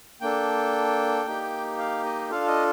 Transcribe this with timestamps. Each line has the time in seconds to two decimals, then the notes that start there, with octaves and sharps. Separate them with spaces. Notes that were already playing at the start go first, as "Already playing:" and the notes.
0.21 A#3 D4 A4 G5
1.26 A#3 D#4 G4
1.78 F5
2.04 D#5
2.30 D4 F4 A4 F5
2.48 D#5